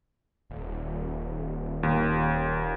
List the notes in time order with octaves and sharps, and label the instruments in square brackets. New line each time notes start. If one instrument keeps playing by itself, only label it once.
[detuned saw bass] D#1
[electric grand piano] D#2